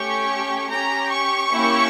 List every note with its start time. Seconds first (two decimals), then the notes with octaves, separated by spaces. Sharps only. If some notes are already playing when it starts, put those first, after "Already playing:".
Already playing: A3 C#4 G4 C#6
0.69 C#4 G4 A#5
1.11 C#6
1.53 A#3 C#4 E4 G4